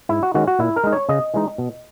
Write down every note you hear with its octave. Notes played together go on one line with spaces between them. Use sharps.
G#2 E4
F#4
D#3 G#3 C#4 F#4
F#4
A#2 E4
A#4
G#3 D#4
C#5
C#3 D#5
E3 G#3 D#4
B2